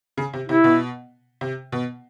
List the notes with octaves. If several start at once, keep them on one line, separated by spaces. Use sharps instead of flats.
C#3
C3
C3 E4
B2
C3
B2